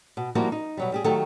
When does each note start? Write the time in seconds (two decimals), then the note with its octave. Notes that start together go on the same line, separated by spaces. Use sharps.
0.17 B2
0.35 F3 G3 A#3 E4 F#4
0.52 D#4
0.77 B2 F#3 G3
0.92 G3 G4 G#4
1.04 D#3 F#3 A3 G4 A4